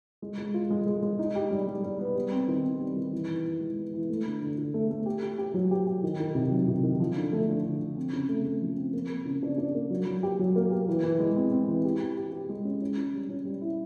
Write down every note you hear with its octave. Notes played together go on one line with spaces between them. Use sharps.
G#3
G#3
F4
G#3
G#3
G#3
D#4
G4
G3
G3
G3
B3
G3
C4
D#3
C4
G3
D#3
E3
E3
E3
G#3
B3
E3
A3
D3
D3
D3
A3
A3
G4
G4
G4
F#3
G4
G4
D#3
D#3
C3
F#3
C3
D#3
F3
D3
A3
D3
D3
D3
C4
C#3
A3
A3
F3
C4
A#3
A#3
C#3
D4
D4
A#3
F#3
F#3
G4
F#3
A#3
G4
E3
E3
G#3
C4
C4
E3
G4
G4
G4
G4
G#3
C#4
C#4
C#4
G3
C#4
G3
E4